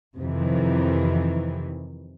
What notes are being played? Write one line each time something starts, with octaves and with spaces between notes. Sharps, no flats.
F2 C3 D#3 E3